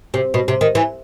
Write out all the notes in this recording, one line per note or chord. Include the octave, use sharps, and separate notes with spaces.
C3
B2
C3
D#3
E3